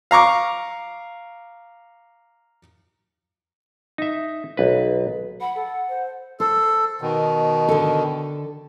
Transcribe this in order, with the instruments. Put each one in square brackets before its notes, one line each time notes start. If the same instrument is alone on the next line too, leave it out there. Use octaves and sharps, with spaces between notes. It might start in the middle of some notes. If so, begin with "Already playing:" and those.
[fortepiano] F5 A#5 C#6 D6
[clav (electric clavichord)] D#4 E5
B1 B4
[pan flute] F#5 [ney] B5
[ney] A4
C5
[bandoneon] A4 [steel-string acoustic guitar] C5
[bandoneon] B2 D#3
[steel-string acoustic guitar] D3 A4